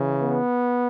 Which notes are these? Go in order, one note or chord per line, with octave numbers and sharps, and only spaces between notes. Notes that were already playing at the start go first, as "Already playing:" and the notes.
Already playing: C#3 E3
B3